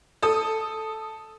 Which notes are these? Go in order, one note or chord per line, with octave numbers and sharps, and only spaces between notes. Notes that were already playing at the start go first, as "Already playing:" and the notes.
A4 D#6